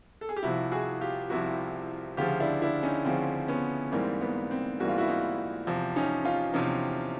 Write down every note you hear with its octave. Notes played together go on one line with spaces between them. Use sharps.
A4
G#4
G4
C2 C3 F3 E4 F#4
F#4 G#4
F4 G4
C2 C3 F3 E4 F#4
D2 C#3 F3 F4 G4
D4 E4
D4 E4
C#4 D#4
D2 C#3 F3 C4
B3 C#4
G#2 E3 G3 A#3 C4
B3
C4
G#2 E3 G3 A#3 F#4
F4
E4 F#4
D#4 F4
E2 C3 F3
C#4 D#4
D#4 F4
E2 C3 F3 C#4 D#4